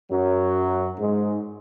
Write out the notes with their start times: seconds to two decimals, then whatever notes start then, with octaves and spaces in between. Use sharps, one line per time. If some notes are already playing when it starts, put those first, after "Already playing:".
0.11 F#2 F#3
0.98 G#2 G#3